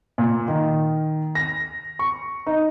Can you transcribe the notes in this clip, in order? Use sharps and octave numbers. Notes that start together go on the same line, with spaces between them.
A#2
D#3
A#6
C#6
D#4